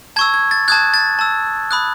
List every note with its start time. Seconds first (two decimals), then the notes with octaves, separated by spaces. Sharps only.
0.16 A5 C#6 E6 G#6
0.34 G#6
0.51 A6
0.68 A5 D#6 F#6 G#6
0.94 A6
1.19 A5 E6
1.71 B5 D#6 F#6